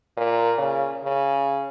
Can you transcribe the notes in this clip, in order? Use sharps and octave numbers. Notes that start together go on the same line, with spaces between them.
A#2
C#3
C#3